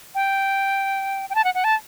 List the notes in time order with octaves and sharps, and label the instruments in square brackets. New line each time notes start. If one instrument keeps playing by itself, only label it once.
[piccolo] G5
G5
A5
F#5
F#5
A5